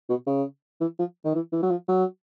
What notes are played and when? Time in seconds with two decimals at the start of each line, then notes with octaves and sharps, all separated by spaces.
0.09 B2
0.27 C#3
0.81 E3
0.99 F3
1.25 D#3
1.35 E3
1.52 E3
1.63 F#3
1.71 F3
1.88 F#3